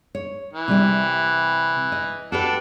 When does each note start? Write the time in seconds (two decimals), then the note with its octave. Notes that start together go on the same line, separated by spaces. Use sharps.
0.15 C#5
0.53 E3
0.68 C3 G3 G4
1.92 D#5
2.32 D4 F#4 G4 A4 B4